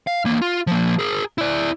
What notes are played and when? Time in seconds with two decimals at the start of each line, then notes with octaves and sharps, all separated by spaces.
0.07 F5
0.25 E2 A#3
0.42 F4
0.67 F3 A#3
0.99 G#4 A#4
1.38 E4 D5